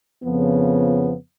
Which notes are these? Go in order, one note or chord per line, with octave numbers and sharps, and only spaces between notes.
F2 C#3 F3 B3